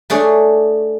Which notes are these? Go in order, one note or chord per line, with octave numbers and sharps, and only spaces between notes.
A3 D4 G#4 C#5